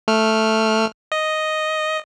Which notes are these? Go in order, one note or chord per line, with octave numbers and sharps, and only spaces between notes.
A3 F6
D#5